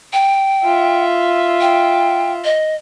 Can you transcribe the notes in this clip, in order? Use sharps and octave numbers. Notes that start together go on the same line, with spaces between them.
G5
F4 E5
G5
D#5